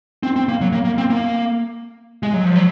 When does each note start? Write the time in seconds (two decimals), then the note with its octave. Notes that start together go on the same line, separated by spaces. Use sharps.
0.23 C4
0.36 C4
0.49 A#3
0.61 F#3
0.73 A#3
0.85 A#3
0.98 C4
1.10 A#3
2.23 G#3
2.34 F#3
2.45 F3
2.56 F#3